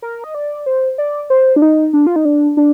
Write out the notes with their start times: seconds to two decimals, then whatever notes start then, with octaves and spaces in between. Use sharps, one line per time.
0.02 A#4
0.24 D#5
0.35 D5
0.66 C5
0.98 D5
1.30 C5
1.56 D4
1.62 D#4
1.93 D4
2.07 F4
2.16 D#4
2.25 D4
2.57 D4